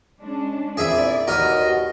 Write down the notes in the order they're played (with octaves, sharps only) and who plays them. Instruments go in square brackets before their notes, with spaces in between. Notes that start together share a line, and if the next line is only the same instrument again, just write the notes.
[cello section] G#3 C#4 D4
[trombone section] A#2 C4 E4 [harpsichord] G#4 E5 B5 [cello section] D5
[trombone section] D#2 [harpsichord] B3 A#4 [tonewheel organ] F#4 D#5